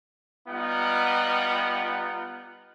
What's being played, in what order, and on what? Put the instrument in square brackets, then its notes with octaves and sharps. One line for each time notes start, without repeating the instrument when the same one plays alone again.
[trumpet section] G3 B3 D#4 F4 F#5